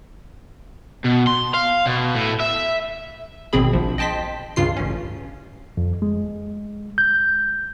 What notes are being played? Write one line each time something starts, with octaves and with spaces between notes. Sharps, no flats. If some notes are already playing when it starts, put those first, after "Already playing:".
B2
C6
F5
B2
A2
E5
G#1 B2 C4 G#4 B5
A#1 F3
D#5 G5 A5 C6 B6
C#2 G2 C#3 F4 C7
A1 C#4
F2
G#3
G6